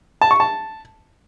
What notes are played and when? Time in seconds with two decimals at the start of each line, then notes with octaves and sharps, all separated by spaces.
0.22 A5
0.31 C#6
0.40 A5